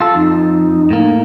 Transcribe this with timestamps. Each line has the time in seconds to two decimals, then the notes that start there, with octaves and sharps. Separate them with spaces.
0.01 F4 A4
0.15 F2 D#4
0.91 A2 A#3